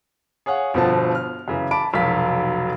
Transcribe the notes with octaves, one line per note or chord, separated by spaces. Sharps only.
G#4 C#5 F5 F#5
G1 B2 F3 C5 A5
F6
F#2 C#3 E3
A5 B5 D6 D7
F1 B1 F#3 F5 B6